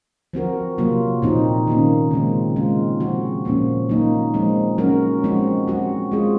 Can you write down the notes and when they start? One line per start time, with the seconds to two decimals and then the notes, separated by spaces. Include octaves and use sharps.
0.33 F3 C4 F#4 A#4
0.78 C3 F#3 A#3 F4
1.22 A#2 F3 C4 D#4
1.67 D#3 A#3 C#4
2.11 C#3 G#3 C4
2.56 G#3 C4 F4
3.00 F3 C4 F#4
3.45 A#2 F3 A#3 C#4
3.89 F#3 A#3 D#4
4.34 F3 G#3 C4
4.78 F#3 C#4 F#4 A#4
5.23 F3 G#3 C4 F#4
5.68 F#3 C4 F#4
6.11 G#3 C4 F4 G#4